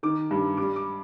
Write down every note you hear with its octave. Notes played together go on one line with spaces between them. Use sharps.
D#3 D6
G2
G3 D6
D6